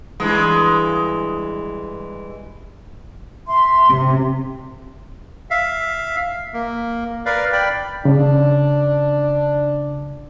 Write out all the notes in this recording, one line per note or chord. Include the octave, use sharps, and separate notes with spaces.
G2 E3 G#3
E5 C6
C3
E5 F5
A#3
A#4 B4 D5 F5
D5 G5 B5
C#3 D4